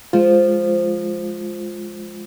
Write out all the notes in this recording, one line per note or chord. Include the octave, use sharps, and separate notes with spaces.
F3 G#3 F4